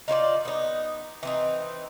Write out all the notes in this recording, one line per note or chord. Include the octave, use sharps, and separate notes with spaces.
D#4 F4 C#5 D5
B3 D#4
E3 C4 D#4